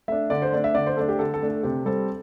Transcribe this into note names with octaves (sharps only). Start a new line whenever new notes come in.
A3 D4 E5
D3 D5
C5
A3 D4 D5
E5
D3 D5
C5
A3 D4 A4
G4
D3 A4
A4
A3 D4
A4
C3 G4
G3 C4 A4